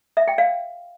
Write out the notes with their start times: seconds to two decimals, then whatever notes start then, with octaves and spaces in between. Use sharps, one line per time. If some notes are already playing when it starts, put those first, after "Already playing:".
0.17 E5
0.28 G5
0.38 F5